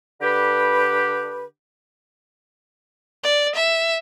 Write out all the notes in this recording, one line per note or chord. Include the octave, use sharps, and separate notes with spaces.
D3 G4 B4
D5
E5